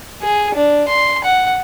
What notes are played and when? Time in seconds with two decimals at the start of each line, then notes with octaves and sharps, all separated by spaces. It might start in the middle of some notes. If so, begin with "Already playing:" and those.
0.22 G#4
0.55 D4
0.88 C6
1.24 F#5